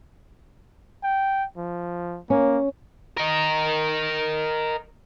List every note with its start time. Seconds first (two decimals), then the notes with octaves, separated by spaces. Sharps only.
1.03 G5
1.57 F3
2.30 A#3 C#4
3.17 A#4 D#5